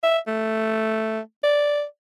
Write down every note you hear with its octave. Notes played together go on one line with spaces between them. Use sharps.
E5
A3
D5